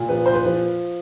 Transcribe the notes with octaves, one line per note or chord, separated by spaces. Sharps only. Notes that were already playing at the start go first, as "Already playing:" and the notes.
Already playing: A#2
F3 B4
C5
B4
F3